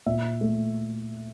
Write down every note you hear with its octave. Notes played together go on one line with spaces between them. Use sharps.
A#2 E5
A3